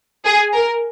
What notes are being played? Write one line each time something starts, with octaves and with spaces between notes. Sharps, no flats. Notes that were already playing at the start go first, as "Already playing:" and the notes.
G#4
A#4